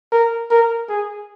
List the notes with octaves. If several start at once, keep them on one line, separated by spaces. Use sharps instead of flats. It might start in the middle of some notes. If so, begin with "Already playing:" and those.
A#4
A#4
G#4